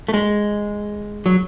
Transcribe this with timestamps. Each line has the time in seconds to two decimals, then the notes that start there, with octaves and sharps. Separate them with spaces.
0.08 A3
0.14 G#3
1.26 F#3